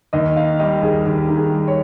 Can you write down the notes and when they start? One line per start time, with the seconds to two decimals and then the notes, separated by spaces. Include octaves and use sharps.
0.13 D#2 D#5
0.36 D#3 F5
0.59 G3 D#5
0.82 D#2 G#4
1.06 D#2 G4
1.29 D#3
1.37 G#4
1.52 G3
1.68 C#5